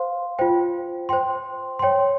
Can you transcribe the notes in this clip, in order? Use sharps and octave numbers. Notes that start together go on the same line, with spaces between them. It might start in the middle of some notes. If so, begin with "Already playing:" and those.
Already playing: C5 F5 C6
F4 C5 G5
C5 G5 C6
C#5 G5 C6